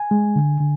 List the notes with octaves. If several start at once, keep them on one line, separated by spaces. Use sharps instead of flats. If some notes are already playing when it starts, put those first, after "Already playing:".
Already playing: G#5
G#3
D3
D3